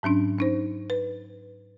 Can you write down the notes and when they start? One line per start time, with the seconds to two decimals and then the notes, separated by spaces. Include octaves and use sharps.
0.03 G#2 F#3 C#4 D4
0.38 C#4 D#4 C5
0.90 B4